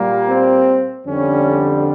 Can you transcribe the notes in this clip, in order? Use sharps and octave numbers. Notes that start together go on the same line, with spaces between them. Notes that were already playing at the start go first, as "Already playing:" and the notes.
Already playing: A#2 G3 A#3
C4
F2 D3 G3 C#4